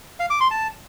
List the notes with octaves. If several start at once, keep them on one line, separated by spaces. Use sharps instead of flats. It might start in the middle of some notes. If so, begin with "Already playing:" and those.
F5
D6
C6
A5